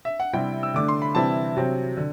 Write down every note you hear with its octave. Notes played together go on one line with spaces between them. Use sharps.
E5
F#5
C3 G3 C4 E4 G5
E6
D3 A3 D4 D6
C6
B5
C3 E3 G3 C4 E4 A5
C3 F#3 C4
D3